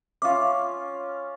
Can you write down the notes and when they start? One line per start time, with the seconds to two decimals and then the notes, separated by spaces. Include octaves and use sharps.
0.22 C#4 F4 E5 F5 D6